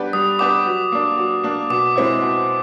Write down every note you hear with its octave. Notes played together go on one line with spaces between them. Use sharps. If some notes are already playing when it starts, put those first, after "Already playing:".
Already playing: G3 B3 D4 G4 B4
G3 D#6
B3 D4 G4 B4 D6
F#3
A#3 D4
F#3
A#3 D4
B2 D6
G#3 C4 E4
B2